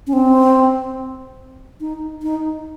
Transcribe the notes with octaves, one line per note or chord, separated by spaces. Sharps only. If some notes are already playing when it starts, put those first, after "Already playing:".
C#4
C4
D#4
D#4